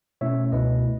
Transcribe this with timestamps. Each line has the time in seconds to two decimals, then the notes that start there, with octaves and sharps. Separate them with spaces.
0.21 B2 A3 C#4 E4 C#5 E5
0.52 C#2 B2 A3 E4 B4 D#5